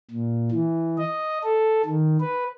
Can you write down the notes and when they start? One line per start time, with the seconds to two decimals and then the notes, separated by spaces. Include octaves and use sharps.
0.11 A#2
0.51 E3
0.98 D#5
1.44 A4
1.85 D#3
2.20 B4